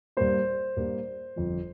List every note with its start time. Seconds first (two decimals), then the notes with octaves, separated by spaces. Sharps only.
0.17 G2 G3 A#3 C5
0.77 G2 G3 A#3
1.36 G1 F2 F3